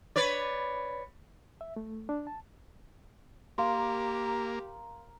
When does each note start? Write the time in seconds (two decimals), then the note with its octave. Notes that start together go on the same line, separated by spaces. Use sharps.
0.16 B4 C#5 D5
1.61 E5
1.76 A3
2.09 D4
2.27 A5
3.58 A#3 G4 A#4 F5 C6